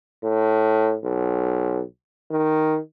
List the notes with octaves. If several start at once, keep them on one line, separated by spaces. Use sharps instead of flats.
A2
B1
D#3